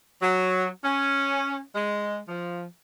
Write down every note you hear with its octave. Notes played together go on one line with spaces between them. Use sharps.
F#3
C#4
G#3
F3